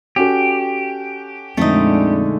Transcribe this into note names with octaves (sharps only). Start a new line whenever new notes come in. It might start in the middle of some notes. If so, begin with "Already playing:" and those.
C#4 F#4 G4 A4
F2 A#2 D3 G#3 A3 D#4